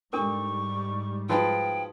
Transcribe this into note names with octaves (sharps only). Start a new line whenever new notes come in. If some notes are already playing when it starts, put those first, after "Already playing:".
G#2 G3 D4 A4 A#4 C#6
F3 D#4 F#4 G#4 B4 G5